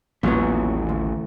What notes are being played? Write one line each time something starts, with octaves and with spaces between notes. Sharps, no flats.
A1 D#2 A#2 F#3 B3
D2